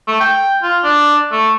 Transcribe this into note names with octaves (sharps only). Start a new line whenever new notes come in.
A3
G5
F4
D4
A3